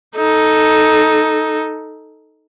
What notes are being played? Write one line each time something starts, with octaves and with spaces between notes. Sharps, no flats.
D#4 A4